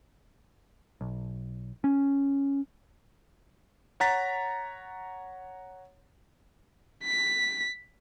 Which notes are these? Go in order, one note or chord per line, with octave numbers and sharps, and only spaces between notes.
B1
C#4
C#5 F#5 A#5 A6 B6
B6